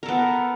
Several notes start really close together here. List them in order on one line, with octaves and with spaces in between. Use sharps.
A#4 A4 B3